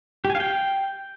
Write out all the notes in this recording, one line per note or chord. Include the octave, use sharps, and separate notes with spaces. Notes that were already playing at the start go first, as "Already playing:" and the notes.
G4
G#5
F5
G5